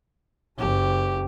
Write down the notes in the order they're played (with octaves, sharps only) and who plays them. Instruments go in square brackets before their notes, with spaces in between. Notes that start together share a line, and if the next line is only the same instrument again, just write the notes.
[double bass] F#1 [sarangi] G4